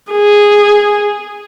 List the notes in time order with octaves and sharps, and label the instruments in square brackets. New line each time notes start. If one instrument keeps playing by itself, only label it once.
[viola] G#4